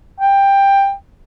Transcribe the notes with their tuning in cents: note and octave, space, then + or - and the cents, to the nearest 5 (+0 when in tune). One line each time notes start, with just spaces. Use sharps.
G5 +15